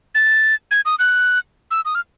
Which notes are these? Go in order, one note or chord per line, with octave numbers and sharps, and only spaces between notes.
A6
G#6
D#6
F#6
E6
D#6
F6